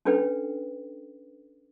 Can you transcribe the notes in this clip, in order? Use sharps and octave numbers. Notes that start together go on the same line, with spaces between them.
C#4 D4 A4 B4 G5